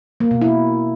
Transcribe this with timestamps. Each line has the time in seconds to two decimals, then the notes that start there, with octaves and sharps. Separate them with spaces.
0.20 A#3
0.31 B2
0.42 E4